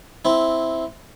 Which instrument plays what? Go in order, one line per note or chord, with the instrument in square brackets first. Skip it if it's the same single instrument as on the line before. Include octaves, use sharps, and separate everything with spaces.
[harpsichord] C4 E4